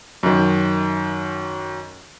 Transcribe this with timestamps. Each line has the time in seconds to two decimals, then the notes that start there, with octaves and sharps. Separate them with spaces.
0.23 F#2 D#3